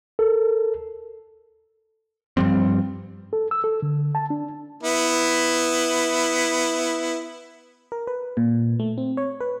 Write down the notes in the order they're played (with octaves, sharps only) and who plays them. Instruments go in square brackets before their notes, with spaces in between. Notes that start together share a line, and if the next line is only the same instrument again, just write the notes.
[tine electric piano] A4 A#4
[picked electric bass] G2 F3 G3 C4
[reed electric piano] A4
E6
A4
D3
A5
D4
[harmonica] B3 E4
[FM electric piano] A#4
B4
A#2
A3
C4
C#5
B4